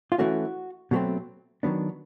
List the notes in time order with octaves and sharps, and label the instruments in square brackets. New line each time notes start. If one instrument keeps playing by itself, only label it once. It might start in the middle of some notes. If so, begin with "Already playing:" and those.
[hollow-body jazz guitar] F4
E3 A3 C#4 F#4
B2 F#3 A3 C4
D#3 F#3 B3 D4